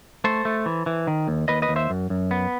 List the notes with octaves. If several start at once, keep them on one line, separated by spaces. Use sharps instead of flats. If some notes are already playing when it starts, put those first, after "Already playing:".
A3 A4 C5
A3
E3
E3
D#3
D#2
D#2 B4 D#5
B4 D#5
D#2
C5 E5
F#2
F#2
B3